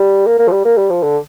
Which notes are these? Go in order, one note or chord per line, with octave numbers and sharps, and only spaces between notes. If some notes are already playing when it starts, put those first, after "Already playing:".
Already playing: G3
A#3
A#3
F3
G3
A#3
G3
F3
D3